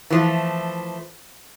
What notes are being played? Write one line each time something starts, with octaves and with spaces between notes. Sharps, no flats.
E3 F3 A3